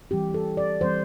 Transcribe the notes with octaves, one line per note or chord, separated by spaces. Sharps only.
E3 G3 C4 G4
A4
D5
E3 G3 C4 C5